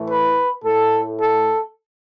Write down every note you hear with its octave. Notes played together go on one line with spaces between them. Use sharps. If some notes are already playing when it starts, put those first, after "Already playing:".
Already playing: A2 E3 A3
B4
A2 A3 A4
A4